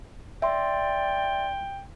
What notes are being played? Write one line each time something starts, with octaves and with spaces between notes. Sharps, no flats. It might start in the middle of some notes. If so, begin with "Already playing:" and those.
D5 E5 G5 C6